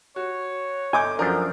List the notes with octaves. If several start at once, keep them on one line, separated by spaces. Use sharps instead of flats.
F#4 C#5
G1 D#5 G#5 D6 G6
F#2 F3 D4 A4 A#4